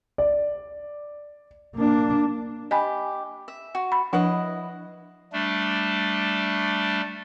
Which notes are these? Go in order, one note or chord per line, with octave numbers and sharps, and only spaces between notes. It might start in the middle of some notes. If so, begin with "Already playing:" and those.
D5
A#3 D4
G4 D#5 G#5 B5
E5
F#4
B5
F3 D4 E4 B4 D#5 F#5
G3 A3 D4